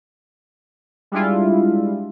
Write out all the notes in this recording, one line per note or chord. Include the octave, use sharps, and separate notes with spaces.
G3 G#3 D4 E4 F4